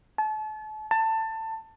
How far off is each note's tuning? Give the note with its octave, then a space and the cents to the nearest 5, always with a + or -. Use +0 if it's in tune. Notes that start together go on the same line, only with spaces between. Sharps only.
A5 -35
A5 +20